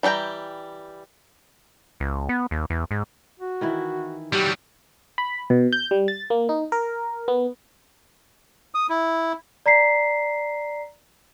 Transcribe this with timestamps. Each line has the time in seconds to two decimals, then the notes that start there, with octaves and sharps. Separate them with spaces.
0.03 E3 G3 B3 G5 A#5
2.00 C#2
2.29 B3
2.51 D#2
2.70 E2
2.91 G#2
3.40 F#4
3.61 D#3 E3 E4
4.33 F#3 G3 G4
5.18 B5
5.50 B2
5.73 G6
5.91 G3
6.08 A6
6.30 A#3
6.49 D#4
6.72 A#4
7.28 B3
8.75 D#6
8.90 E4
9.66 D5 A#5 B6 C7